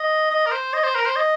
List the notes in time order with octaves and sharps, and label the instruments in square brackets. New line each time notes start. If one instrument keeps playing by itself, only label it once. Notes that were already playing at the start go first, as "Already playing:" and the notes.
Already playing: [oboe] D#5
D#5
A#4
C5
D#5
C5
A#4
C5
D#5